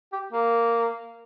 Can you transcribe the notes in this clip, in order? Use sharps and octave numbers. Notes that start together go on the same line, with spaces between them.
G4
A#3